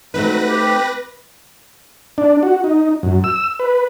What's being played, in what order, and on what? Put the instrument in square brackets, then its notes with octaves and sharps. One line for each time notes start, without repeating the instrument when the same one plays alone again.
[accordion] F#3 [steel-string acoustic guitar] A3 C4 D#4 [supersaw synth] B4 A#6
[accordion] G4
[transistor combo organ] D4
F#4
D#4
F#2
E6
B4